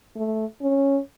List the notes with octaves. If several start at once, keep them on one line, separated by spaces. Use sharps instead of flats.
A3
C#4